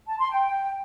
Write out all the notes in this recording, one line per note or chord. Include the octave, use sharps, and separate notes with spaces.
A5
C6
G5